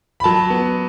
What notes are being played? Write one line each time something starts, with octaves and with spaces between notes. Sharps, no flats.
B5
F#3 A5
B3